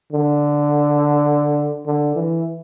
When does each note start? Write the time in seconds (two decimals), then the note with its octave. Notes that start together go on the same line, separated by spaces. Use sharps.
0.12 D3
1.86 D3
2.16 E3